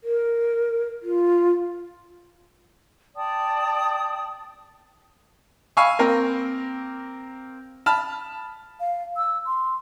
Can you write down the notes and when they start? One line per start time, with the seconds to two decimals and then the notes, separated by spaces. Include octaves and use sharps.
0.04 A#4
1.02 F4
3.16 D5 G5 A5 D#6
5.77 F5 G#5 B5 C#6 E6
5.99 A#3 C4 A#4
7.86 A5 B5 F6 A6
8.80 F5
9.17 E6
9.46 C6